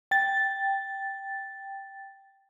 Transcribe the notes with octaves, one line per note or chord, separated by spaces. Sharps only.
G5 A6